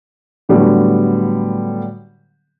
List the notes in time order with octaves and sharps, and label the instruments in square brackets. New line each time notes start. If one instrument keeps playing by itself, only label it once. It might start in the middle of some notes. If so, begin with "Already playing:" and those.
[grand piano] A2 D3 F#3 G3 B3